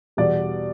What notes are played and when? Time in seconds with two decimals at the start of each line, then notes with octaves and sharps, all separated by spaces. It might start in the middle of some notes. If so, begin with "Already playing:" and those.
0.17 E2 B2 G3 D5